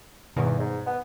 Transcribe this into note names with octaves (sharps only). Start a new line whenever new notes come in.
E2 G2 B2 D#3
G#2
B3